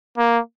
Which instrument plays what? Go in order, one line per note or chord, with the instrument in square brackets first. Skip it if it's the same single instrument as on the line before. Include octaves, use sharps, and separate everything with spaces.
[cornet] A#3